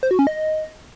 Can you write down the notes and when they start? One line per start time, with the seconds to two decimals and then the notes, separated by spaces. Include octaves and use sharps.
0.03 C5
0.11 F#4
0.19 C#4
0.27 D#5